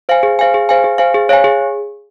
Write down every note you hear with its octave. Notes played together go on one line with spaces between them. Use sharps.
C5 F5 G#5
G#4
C5 F5 G#5
G#4
C5 F5 G#5
G#4
C5 F5 G#5
G#4
C#5 F5 G#5
G#4